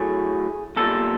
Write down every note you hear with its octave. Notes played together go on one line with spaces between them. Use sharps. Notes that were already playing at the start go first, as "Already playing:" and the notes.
Already playing: A2 F#3 A3 G#4
B1 A#2 G3 A4